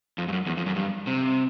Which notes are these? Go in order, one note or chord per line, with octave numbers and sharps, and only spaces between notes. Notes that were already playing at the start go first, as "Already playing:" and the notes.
F2
G2
F#2
E2
F2
F#2
G2
C3